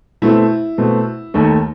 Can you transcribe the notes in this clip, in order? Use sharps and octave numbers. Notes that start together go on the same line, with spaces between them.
B2 A3 C4 E4
B2 A3 C4
D#2 D#3 A3